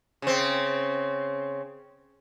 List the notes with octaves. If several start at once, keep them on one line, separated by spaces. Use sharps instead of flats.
C#3 C4